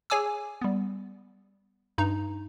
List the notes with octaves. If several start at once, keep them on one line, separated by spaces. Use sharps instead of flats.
G#4 C#5 G#5 D6 E6
G3 B3
G2 D#4 A#5